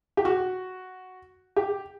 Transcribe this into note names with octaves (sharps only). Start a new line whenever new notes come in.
G4
F#4
G4